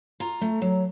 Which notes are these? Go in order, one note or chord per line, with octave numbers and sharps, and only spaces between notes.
F4 A#5
A3
F#3